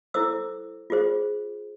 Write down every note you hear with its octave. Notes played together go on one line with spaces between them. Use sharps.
E4 A4 C5 D6 E6
F4 G#4 C5